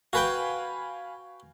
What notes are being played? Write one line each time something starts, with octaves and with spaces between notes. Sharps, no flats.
F#4 B4 F5 G5 G#5 B5